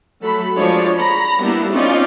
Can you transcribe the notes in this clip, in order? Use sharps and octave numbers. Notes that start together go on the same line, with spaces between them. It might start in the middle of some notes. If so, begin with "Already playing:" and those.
F#3 A3 A4 B5
F3 G#3 D4 C#5 D5
A#5 B5
G3 A#3 B3 D4 E4
C4 C#4 D#4 F4 D5